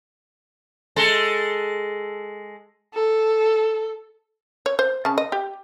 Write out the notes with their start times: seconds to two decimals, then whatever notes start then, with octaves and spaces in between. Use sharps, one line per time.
0.96 G#3 A4
2.94 A4
4.66 C#5
4.79 C5
5.05 C#3 A5
5.18 D#5
5.32 G4